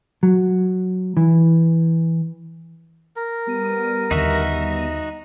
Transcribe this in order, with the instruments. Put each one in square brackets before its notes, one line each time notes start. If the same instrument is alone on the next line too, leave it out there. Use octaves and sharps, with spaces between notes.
[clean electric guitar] F#3
E3
[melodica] A#4
[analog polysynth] G3 B3 D#7
[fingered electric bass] D#2 D3 [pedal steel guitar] D#4 F#4 E5